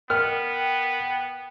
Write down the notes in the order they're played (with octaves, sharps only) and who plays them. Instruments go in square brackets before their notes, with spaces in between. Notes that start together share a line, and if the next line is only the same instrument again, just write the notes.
[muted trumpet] B3 [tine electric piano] A#4 [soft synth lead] G5 [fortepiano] F6